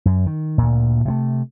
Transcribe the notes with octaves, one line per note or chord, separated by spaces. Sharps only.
F#2
D#3
D2 A#2
C3 E3 A3